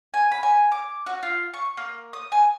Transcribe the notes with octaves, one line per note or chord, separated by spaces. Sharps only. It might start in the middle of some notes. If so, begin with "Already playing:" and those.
G#5
B5
G#5
D6
F#4
F4
C#6
A#3
D#6
G#5